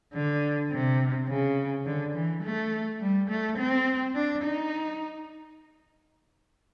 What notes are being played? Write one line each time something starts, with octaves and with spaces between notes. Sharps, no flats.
D3
C3
C#3
D3
E3
A3
G3
A3
C4
D4
D#4